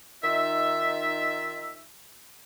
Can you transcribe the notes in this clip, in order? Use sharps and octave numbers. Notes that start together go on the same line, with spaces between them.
D#3 D#4 F4 E5